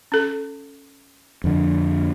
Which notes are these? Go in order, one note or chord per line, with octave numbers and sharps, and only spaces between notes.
C#4 A4
F2 D3